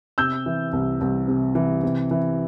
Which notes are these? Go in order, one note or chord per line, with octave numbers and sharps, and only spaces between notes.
C3 E6 G6
E3
C2
C2
C3
E3
C3
E3